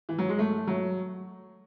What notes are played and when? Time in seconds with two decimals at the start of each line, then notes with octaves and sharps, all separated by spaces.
0.09 E3
0.18 F#3
0.29 G#3
0.39 A3
0.67 F#3